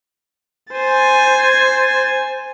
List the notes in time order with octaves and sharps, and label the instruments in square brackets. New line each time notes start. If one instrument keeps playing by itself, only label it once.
[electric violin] C5 A6 [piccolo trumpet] G#5